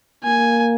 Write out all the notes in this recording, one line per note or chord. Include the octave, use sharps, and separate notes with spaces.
A#3 G#5